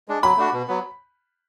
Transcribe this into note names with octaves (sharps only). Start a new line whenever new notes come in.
G#3 D4
F#3 B5
A3 D4 F#4
B2
F#3 B3